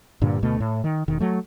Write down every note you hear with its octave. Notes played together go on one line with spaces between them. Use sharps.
G2 A#2 D3
D2 B2 A3
A2
D#3
E1 D#3
F#3 A3